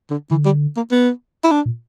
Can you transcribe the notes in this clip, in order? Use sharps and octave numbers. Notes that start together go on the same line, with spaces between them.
D3
D3 E3
G3
A#3
B3
E4
D4
A#2